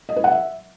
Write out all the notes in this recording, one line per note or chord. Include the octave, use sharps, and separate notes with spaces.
D#5
B4
F#5
E5